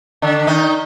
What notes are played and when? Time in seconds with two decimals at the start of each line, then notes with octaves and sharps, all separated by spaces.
0.22 D3 D4
0.47 D#3 D#4